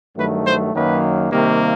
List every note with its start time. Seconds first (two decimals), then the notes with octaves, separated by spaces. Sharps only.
0.16 G2 D#3 F#3 A3 B4
0.45 C5
0.74 F#2 D#3 F#3 A#3 B4
1.31 C3 D#3 G3 A#3